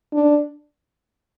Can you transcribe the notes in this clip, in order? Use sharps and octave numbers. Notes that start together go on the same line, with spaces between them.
D4